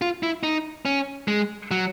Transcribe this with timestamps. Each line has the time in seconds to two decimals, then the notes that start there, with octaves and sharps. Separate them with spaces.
0.02 F4
0.23 E4
0.43 D#4
0.85 C#4
1.28 G#3
1.71 F#3